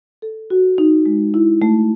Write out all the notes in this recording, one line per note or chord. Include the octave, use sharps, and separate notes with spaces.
A4
F#4
D#4
G#3
E4
A3